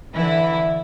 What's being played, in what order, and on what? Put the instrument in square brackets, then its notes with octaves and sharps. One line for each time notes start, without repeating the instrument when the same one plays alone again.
[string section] D3 E3 E4